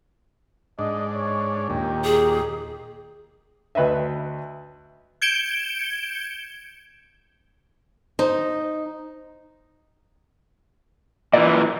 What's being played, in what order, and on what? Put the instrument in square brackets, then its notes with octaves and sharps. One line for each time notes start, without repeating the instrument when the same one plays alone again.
[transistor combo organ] G#2 D4 [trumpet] D#5
[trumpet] C#5
[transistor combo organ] D#2 A#2 [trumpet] G4
[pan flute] G#4
[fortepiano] D2 B4 D#5 E5
[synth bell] G6 G#6 C#7 D7 E7 G7
[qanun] D#4 [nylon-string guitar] C5
[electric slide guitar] A#2 E3 [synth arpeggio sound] D5